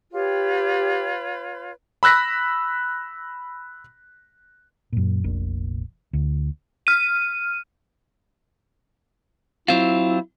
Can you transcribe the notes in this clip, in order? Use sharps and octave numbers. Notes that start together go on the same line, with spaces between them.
F4 G4 B4 C#5
B5 E6 F#6 A#6 B6
F#2 A#2
F1 A#1 A#2
D2
F6 D#7
F#3 C4 E4 F4